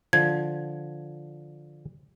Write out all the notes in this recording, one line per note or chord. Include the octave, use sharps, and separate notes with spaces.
D3 F3 G#6